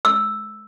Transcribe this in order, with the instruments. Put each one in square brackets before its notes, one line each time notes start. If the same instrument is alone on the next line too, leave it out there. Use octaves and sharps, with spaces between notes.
[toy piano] E6